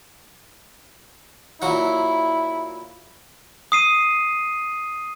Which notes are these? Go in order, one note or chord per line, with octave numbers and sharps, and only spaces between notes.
A#2 F#3 E4 F#5
D#6 C7 D#7